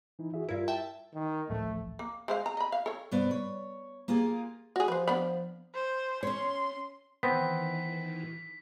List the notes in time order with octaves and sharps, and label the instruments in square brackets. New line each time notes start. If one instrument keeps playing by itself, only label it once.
[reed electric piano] E3 D#4 E4
F#4 G#4 E5
[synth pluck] G2 E4 [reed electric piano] F4 A#4
[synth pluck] E5 G5 A5
[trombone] D#3
[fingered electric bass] D1 A1 F3 [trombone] A3
[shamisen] A#3
G#3 C5 F5
A#5
D#5 B5
F5
A4 C#5
[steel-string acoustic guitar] G2 C3 B3 C5 D5
C#5
A#3 F4 G4 G#4
[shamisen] F#4 G#4
[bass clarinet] F3 [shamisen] B4 C5
[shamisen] B3 D4 B5
[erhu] C5
[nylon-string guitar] C#4 C#5 [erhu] C6
[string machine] D#3 E3 [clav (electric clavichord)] B3 C4 [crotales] B6